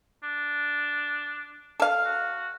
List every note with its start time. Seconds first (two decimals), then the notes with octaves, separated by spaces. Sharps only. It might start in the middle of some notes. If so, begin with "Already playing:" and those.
0.23 D4
1.80 A4 F5
2.05 F#4